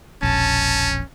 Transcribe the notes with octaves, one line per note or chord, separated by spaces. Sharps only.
E1 A#1 C#4 A5